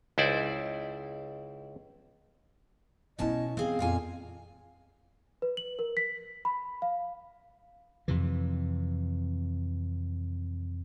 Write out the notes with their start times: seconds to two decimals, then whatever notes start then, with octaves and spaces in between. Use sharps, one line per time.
0.18 C#2 D#4 E4 C5 D5
3.18 B2 A3 C#4 E4 D#5 A5
3.57 E3 C4 G#4 F5
3.79 F2 A#2 F4 G#5
5.42 B4
5.57 F#7
5.79 A#4
5.97 B6
6.45 B5
6.82 F5
8.08 F2 C3 E3